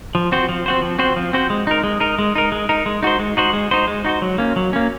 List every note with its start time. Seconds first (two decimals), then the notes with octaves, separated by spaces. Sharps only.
0.15 F3
0.32 C4 F#4 C5
0.49 F3
0.66 C4 F#4 C5
0.82 F3
0.99 C4 F#4 C5
1.16 F3
1.33 C4 F#4 C5
1.50 G#3
1.67 D#4 A#4
1.84 G#3
2.00 D#4 A#4
2.19 G#3
2.36 D#4 A#4
2.52 G#3
2.69 D#4 A#4
2.86 G#3
3.03 D#4 F#4 C5
3.19 G#3
3.37 D#4 F#4 C5
3.53 G#3
3.71 D#4 F#4 C5
3.87 G#3
4.05 D#4 F#4 C5
4.22 F#3
4.38 A#3 C#4
4.56 F#3
4.73 A#3 C#4